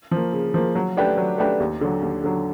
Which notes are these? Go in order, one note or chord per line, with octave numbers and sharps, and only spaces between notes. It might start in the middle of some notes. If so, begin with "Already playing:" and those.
F3 A#3
C#3
F3 A#3
F#3
A3 D4 G4 B4
F#3
A3 D4 G4 B4
D#2
D3 F#3
D#2
D3 F#3